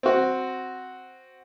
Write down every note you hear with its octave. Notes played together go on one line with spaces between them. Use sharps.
C4 F#4